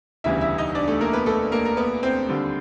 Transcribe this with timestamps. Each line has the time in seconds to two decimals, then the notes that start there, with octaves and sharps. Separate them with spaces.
0.24 E1 D2 C#3 E3 G3 E4 E5
0.41 E4 E5
0.58 D#4 D#5
0.75 D4 D5
0.88 A3 A4
1.01 A#3 A#4
1.13 B3 B4
1.26 A3 A4
1.52 A#3 A#4
1.65 A#4
1.77 B3 B4
2.03 C4 C5
2.28 D#2 D3 G3